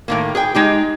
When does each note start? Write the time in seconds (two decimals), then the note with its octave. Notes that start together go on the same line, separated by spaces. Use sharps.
0.08 A2 D#3 A#3
0.35 G#4 B4 G5
0.55 G#3 D#4 G4